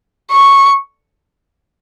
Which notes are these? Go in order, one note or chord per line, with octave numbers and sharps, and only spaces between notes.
C#6